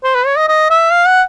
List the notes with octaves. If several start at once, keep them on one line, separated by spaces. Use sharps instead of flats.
C5
B4
C#5
D#5
D#5
E5
F5
F#5